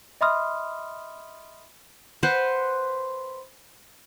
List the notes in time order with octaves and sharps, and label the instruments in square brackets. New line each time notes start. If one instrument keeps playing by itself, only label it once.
[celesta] D#5 E5 B5 C6 D#6 F6
[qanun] B4 C5 F#5 C6